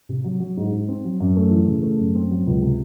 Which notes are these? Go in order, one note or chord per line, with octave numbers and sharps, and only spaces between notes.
C3
F#3
F#3
G#2
G#2
C4
F#3
F#2
A3
E3
C#3
A3
F#2
C4
F#3
C#2
C3